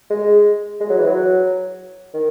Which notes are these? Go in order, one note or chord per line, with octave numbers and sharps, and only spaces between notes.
G#3
G#3
F#3
E3
F#3
D#3